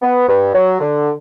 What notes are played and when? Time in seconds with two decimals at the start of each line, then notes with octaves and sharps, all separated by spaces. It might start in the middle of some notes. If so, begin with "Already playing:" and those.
0.02 B3
0.28 G2
0.54 F#3
0.80 D3